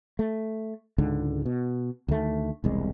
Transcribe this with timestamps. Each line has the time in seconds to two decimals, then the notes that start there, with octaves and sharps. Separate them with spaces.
0.19 A3
0.98 C#2 G#2 D3
1.46 B2
2.08 D2 D#3 A3
2.64 E1 C2 G#3